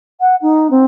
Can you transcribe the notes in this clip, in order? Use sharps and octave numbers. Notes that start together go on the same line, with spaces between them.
F#5
D#4
C4